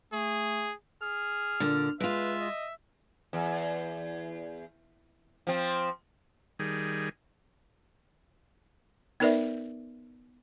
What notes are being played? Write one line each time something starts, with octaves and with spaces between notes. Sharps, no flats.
A3 G#4
G#4 F6
A#2 D3
G#3 F4 B4 E5
D#5
E2
F3 C4
D#3 G3 G#4
B3 D#4 A#4 B4 D5 E5